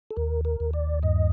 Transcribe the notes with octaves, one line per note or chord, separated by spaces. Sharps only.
A4
D#2 A#4
A#4
D#2
D5
G2 D#5